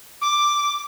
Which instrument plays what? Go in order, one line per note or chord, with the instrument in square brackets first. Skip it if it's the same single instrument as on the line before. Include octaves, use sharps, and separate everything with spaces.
[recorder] D6